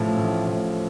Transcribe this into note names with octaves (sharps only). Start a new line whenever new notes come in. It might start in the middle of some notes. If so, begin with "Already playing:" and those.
Already playing: A1 A2 F3
A1
A2 F3